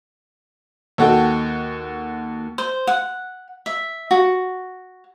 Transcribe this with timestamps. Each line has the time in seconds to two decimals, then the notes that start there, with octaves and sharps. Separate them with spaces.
0.98 D#2 F#4 A4 G5
2.58 C5
2.87 F#5
3.66 E5
4.11 F#4